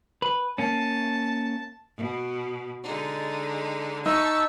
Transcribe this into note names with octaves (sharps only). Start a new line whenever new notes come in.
B4
A#3 C#4 A5
B2
D3 G#3 D#4
D#4 E5 A5 C#6 E6